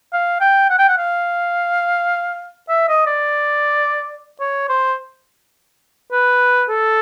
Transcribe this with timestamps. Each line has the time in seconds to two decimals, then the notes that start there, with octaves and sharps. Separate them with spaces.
0.13 F5
0.41 G5
0.70 F#5
0.79 G5
0.88 F#5
0.98 F5
2.69 E5
2.89 D#5
3.07 D5
4.40 C#5
4.69 C5
6.12 B4
6.69 A4